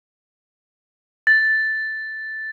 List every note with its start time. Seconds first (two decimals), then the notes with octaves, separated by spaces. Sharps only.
1.27 A6